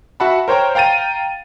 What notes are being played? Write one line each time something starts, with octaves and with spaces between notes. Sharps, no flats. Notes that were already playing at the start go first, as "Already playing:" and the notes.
F#4 E5 F#5 A5 B5
A#4 C5 C#5 G5 A#5
F5 G5 A#5 A6 D#7